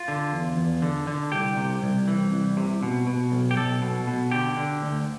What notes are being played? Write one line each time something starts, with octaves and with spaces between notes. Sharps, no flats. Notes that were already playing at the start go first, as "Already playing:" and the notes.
Already playing: F4
D3
E2
E2
D3
D3
C2 G4
C3
C2
E3
C2
C3
B2
B2
B1
G4
B1 A4
B2
B2
D3 G4
D3
D2